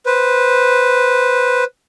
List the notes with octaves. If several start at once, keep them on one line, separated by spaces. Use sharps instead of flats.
B4 C5